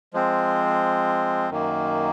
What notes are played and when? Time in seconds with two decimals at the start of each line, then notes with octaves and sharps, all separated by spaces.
0.14 F3 G#3 C4
1.50 F#2 D#3 A#3